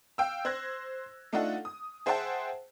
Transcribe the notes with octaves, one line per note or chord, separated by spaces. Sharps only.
F5 G5 E6
C5 E6 F#6 G#6 A#6
A3 D4 D#4 F4 A4 F#5
D#6
G#4 C5 E5 F#5 G5 A5